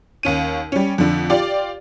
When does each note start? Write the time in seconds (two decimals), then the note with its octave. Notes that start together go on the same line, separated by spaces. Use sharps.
0.23 D#2 C#4 D#7
0.72 G3 C#4
0.98 F2 D3
1.30 F4 G4 D5